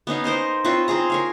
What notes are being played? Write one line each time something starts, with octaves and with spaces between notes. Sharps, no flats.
B3 C#4 D#4 F5
A#4 C5 D#5 F5
C4 F4 B4 C#5
C4 F4 G#4 A#5
A#4 C#5 F5